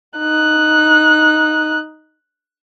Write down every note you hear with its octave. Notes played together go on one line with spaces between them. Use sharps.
D#4 F#6